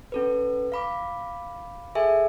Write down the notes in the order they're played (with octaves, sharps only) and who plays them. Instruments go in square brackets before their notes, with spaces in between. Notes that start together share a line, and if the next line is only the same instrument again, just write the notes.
[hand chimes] C#4 A4 B4
F5 B5 D6
G#4 A4 E5 G#5